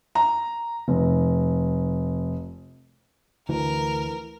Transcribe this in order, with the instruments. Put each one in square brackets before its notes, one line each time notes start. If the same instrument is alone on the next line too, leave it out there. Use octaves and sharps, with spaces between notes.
[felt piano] A#5
F1
[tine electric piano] D2 [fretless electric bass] E3 [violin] A#4